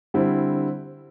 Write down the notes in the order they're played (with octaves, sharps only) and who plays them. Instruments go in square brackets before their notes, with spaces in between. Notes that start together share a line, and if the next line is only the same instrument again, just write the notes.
[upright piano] D3 G3 C4 E4